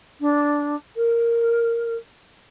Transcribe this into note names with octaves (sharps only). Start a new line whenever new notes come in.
D4
A#4